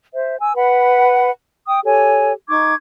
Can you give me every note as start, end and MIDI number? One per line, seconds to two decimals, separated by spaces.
0.13 0.36 72
0.13 0.36 76
0.40 0.51 80
0.40 0.51 88
0.56 1.30 71
0.56 1.30 78
0.56 1.30 83
1.67 1.79 79
1.67 1.79 87
1.84 2.33 67
1.84 2.33 69
1.84 2.33 73
1.84 2.33 80
2.49 2.74 63
2.49 2.74 85
2.49 2.74 86
2.49 2.74 92